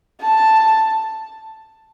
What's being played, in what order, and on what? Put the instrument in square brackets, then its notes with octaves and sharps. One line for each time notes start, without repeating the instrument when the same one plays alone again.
[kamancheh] A5